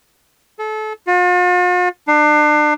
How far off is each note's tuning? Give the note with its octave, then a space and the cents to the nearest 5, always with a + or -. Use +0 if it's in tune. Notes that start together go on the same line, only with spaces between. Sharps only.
A4 -30
F4 +45
D4 +35